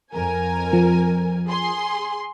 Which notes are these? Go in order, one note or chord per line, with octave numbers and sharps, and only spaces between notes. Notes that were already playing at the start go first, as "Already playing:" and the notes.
F2 A#4 G#5
F3
G#4 C6